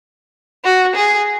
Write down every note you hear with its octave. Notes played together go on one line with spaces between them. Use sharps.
F#4
G#4